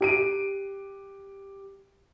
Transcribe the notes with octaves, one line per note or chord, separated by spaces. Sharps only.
G4 D7 D#7